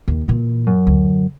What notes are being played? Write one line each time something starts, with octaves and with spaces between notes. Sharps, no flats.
D#2
A#2 E3
F#2
D2